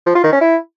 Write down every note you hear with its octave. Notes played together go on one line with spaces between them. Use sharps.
F3
F4
D#3
C#4
E4